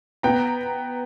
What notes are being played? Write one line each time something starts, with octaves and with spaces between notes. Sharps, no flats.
B3 G5 A#5